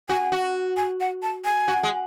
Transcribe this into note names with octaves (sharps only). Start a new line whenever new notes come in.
F#4 G#5
F#4
G#5
F#5
A5
G#5
F#4
G#3